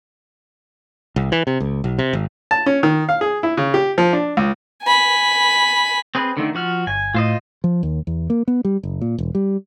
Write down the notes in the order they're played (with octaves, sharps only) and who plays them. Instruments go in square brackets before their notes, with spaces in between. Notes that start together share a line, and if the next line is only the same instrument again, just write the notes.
[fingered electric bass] C2
E3
C3
C#2
B1
C3
G#1
[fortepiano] A5
C#4
D#3
F5
G#4
E4
C#3
G4
F3
D4
C#2
[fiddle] G#5 B5
[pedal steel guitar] C4 G#4 B4
D3 D#3 A3
F3 F#4 F6
[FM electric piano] G1 [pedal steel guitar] G#5
[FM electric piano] A2 [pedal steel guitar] F4 C5 D#5
[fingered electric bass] F3
D#2
E2
A#3
B3
G3
F#1
A#2
E1
G3